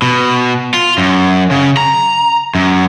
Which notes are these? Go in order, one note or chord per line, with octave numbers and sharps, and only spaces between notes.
B2
F4
F#2
C#3
A#5
F#2